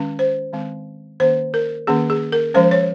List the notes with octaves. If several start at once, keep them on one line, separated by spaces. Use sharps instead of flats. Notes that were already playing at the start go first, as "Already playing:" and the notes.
Already playing: D#3 G#3 C#4
C5
D#3 G#3 C4
D#3 A#3 C#4 C5
A#4
D#3 A#3 C#4 G#4
G#4
A#4
F3 G#3 C#4 C5
C#5